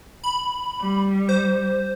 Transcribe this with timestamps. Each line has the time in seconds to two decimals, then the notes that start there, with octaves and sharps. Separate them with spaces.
0.23 B5
0.81 G3
1.29 C5